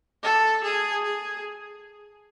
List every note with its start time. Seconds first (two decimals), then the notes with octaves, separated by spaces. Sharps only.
0.23 A4
0.64 G#4
1.03 G#4